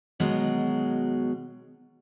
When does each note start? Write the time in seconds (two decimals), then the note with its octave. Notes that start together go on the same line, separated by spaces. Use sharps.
0.20 B2 D#3 F#3 G#3